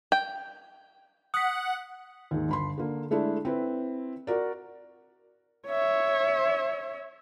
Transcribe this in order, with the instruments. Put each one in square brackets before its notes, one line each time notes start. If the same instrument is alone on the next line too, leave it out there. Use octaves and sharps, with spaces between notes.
[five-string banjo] G5
[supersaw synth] F#5 [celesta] D#6 B6
[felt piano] D#2 G#2
G1 B5 C6
D3 A#3
G#3 A3 D4 E4
C4 E4 B4
F#4 A#4 D5
[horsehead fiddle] C#5 E5